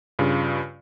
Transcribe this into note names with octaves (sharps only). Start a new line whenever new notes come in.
G2 C#3 F4